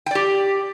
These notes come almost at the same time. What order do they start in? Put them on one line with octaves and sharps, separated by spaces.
G5 D5 G4